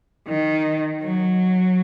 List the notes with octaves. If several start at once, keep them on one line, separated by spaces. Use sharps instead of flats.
D#3
F#3